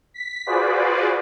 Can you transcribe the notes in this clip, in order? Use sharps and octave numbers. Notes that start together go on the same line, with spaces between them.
B6
F4 F#4 G#4 B4 C5 D5